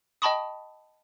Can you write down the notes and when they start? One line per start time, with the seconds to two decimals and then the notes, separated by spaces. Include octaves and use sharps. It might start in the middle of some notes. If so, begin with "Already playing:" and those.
0.22 D#5 G5 A5 B5 C#6 D#6